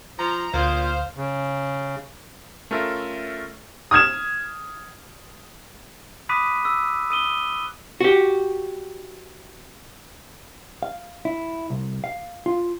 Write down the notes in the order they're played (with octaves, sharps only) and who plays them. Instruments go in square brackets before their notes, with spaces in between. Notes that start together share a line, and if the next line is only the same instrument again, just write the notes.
[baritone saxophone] F3 [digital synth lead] A#5
[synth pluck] D2 D#6 [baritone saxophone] A#2 [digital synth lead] C5 [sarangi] F5
[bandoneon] C#3
[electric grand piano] A3 C#4 F4 A4 A#4 E5
[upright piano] D#6 F6 G#6 E7
[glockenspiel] B5 D6 D#6 F#6 B6 D#7
E6
D#6 D#7 G7
[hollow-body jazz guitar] F#4 G4
F5
E4
C2
F5
F4